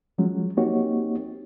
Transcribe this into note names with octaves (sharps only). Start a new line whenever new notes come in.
F3 F#3 G#3 C#4
A#3 C4 D#4 F#4 G4 C#5